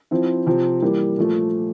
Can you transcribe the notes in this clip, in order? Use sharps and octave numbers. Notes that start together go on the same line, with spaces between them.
F3 C4 E4
C3 F3 C4
E3 G3 A#3
A#2 F3 A3